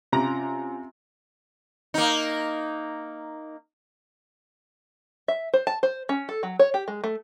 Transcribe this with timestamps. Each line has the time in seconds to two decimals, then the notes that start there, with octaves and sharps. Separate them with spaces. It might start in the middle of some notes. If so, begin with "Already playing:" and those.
0.13 C3 C#4 F4 A#5
1.94 A#3 D#4
5.28 E5
5.54 C5
5.67 A5
5.83 C5
6.09 C#4
6.29 A4
6.43 F#3
6.59 C#5
6.74 G4
6.88 G#3
7.04 A3